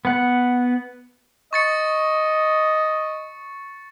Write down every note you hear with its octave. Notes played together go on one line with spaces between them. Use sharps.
B3 F#5
D#5 C#6 A6 C#7